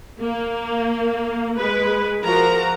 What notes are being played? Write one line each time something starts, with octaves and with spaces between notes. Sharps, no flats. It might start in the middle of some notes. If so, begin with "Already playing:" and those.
A#3
G#3 B4
F3 F#4 A#4 A#5